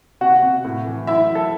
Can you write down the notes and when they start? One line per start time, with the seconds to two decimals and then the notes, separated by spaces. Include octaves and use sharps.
0.21 C3 F#4 F#5
0.43 C3
0.65 A2
0.86 E3
1.07 F#3 E4 E5
1.29 F#3
1.35 A4